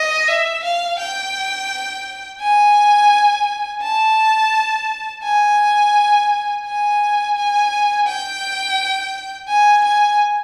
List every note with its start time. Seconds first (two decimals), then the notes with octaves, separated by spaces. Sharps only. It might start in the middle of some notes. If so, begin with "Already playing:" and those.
Already playing: D#5
0.28 E5
0.64 F5
0.99 G5
2.41 G#5
3.83 A5
5.24 G#5
6.66 G#5
7.36 G#5
8.07 G5
9.49 G#5
9.84 G#5